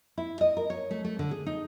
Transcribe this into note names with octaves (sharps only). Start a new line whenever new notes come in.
E4
D#5
A#4
C#5
A3
A3
D3
G#4
D#4